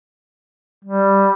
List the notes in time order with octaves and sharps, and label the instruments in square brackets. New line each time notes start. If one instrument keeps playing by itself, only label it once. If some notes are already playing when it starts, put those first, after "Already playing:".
[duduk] G3